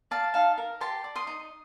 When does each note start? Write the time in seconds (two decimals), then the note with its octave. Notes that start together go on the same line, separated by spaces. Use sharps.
0.11 D5 F5 A5
0.34 D#4 F5 A5
0.58 A#4
0.80 G4 A5 C6
1.04 D5
1.15 C6 D#6
1.27 D#4